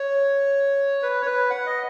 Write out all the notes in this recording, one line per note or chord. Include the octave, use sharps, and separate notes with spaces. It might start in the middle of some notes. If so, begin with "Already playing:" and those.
Already playing: C#5
B4
C#5
B4
F#5
D#5